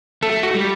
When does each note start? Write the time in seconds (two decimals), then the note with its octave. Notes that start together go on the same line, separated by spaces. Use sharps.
0.22 A3 A4
0.43 F#4
0.55 G3